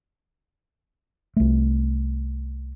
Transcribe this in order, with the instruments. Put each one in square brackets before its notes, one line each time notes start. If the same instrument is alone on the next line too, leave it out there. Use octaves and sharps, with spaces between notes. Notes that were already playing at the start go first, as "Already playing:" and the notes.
[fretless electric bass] C2 A3